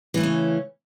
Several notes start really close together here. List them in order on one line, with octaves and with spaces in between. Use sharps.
E3 A3 C#3 C#4